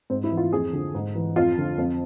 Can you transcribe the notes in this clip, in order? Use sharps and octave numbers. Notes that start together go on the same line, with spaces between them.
G#2 C4
E4
E3
F4
F2 G#4
D3 F3
G#2
E3
F2 F4
D3 F3
F2